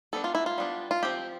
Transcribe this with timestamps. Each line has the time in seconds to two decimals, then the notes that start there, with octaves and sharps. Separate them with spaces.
0.13 G3 B3 D4 A4
0.24 F4
0.35 E4
0.46 F4
0.58 G3 B3 D4
0.91 F4
1.03 F3 C4 G4